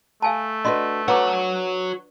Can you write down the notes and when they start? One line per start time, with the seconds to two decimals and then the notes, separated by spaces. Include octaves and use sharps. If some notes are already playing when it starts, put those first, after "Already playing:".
0.22 A3 F5 G#5 A5
0.65 D4 F#4 B4 D#5 C6
1.08 F#4 B4 C#5 F#5 A#5 D6